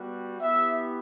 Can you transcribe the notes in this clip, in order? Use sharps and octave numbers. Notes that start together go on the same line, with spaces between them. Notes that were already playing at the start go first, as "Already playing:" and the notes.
Already playing: G3 B3 F#4
B3 E4 G4 E5